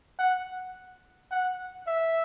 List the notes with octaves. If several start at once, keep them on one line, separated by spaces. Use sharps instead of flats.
F#5
F#5
E5